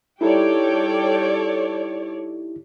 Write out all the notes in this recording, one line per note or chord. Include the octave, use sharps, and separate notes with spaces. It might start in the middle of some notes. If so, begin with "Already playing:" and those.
G3 D#4 E4 G4 A4 C#5 D5 G5